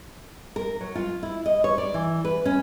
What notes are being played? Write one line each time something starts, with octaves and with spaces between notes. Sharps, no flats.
A#4
F#3
F4
E4
D#5
C#5
D5
E3
B4
C#4